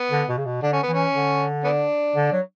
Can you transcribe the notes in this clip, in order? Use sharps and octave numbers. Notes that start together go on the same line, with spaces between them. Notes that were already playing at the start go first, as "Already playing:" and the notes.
Already playing: B3
D3
B2
C#3
B2
D3 D4
C#4
B3
E3 C#4
D3
B3 D4
D3
F#3